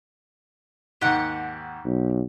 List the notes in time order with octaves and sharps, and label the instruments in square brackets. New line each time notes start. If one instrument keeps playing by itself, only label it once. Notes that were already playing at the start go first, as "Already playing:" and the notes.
[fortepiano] D#2 G#2 [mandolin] G4 F#5
[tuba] B1